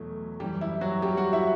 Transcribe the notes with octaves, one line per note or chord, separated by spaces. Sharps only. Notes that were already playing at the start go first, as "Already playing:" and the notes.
Already playing: E2 B2 F#3 A3
F#2 E3 G3 G4
E4
F#3 F#4
G3 G4
F#4 F#5
E4 E5